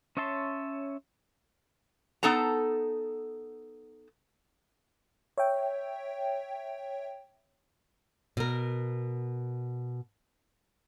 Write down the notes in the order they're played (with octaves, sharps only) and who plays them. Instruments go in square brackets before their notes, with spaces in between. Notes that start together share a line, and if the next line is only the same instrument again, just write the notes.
[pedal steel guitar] C#4 C#5 E5 A5 C6
[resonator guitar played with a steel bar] B3 D#4 A4 A5 A#5
[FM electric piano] C#5 E5 G5
[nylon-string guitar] B2 A#4